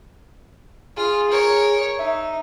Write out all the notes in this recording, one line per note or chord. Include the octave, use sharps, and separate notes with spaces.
F4 G#4
A#4 C#5
D#4 E5